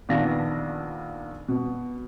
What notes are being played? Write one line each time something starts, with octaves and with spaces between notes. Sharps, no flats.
A#1 D#3 B3 D4 F5 A#6
B2